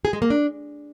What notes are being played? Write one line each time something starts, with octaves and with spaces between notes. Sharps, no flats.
G#4
G#3
A#3
D4